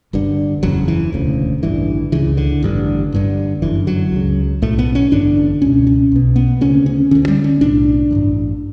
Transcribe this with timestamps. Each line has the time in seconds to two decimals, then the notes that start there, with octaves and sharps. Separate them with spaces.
0.13 G1 G2 D3
0.63 F#1 E2 C#3 F#3
0.88 E3
1.12 E1 D2 C#3
1.62 A1 G2 D3 E3
2.12 C#2 C#3 E3
2.37 D3
2.63 A1 G2 D3
3.12 G1 G2 D3
3.62 G1 F#2 D3 E3
3.87 F#3
4.12 C#2 C#3
4.62 B1 A2 A3
4.79 B3
4.95 C#4
5.11 A1 G2 D3 D4
5.62 C#2 B2 C#4
5.87 C#4
6.12 B1 B2
6.36 B3
6.61 D2 C#3 C#4
6.86 C#4
7.11 D2 D3 C#4
7.28 G3
7.44 C#4
7.61 B1 A2 D4
8.11 A1 G2 D3